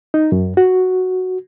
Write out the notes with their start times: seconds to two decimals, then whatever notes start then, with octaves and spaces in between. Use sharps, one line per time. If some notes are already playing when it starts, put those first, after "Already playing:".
0.14 D#4
0.32 F#2
0.57 F#4